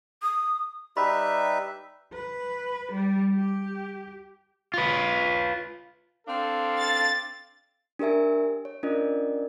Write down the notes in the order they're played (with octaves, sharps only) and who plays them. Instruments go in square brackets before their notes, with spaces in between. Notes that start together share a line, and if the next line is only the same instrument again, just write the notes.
[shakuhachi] D#6
[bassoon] G3 [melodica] D#4 B4 E5 [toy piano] B5
[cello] B4
G3
G4
[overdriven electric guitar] F4 B4
[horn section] C4 D4 A4 [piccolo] F5
[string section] A6
[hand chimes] D4 G4 A#4 E5 G#5
C#5
C#4 D4 F4 A#4 D5 D#5